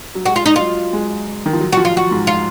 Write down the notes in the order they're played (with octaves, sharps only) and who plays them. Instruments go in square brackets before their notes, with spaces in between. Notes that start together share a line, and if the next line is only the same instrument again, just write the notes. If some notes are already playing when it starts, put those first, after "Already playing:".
[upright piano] F#3
[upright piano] G#3 [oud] F#4
[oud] F4
D#4
[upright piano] F#3 [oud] F4
[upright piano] G#3
D#3
F3
F#3
[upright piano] F3 [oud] F#4
[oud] F4
F#4
[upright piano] G#2
[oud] F4